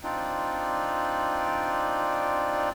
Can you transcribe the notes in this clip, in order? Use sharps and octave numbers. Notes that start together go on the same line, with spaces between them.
C4 D4 D#4 F4 D5